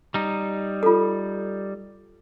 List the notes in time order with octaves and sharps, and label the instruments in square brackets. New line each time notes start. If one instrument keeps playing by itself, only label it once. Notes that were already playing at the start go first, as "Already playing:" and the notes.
[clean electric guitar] G3 D#4
[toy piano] F4 A4